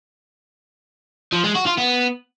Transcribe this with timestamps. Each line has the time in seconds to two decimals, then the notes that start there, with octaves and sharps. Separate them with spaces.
1.32 F3
1.44 G#3
1.55 F#4
1.66 F4
1.77 B3